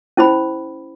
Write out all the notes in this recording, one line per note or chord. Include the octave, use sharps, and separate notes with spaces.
C#4 E4 C5 B5